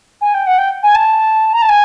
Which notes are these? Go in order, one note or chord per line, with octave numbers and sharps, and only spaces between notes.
G#5
G5
F#5
G5
G#5
A5
A#5
A5
G#5